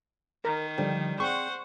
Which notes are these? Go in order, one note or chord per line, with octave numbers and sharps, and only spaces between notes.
D#3 A#4
D3 F3 G3
C4 G#4 C5 F#5 C#6